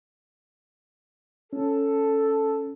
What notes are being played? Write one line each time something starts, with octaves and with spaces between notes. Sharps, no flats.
C#4 A4